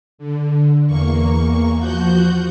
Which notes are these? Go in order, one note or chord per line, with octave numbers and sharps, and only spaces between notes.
D3
E2 A#3 C#6
F3 F#4 F#5 G6